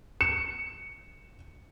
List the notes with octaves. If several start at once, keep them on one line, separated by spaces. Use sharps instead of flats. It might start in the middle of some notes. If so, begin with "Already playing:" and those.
C#7 E7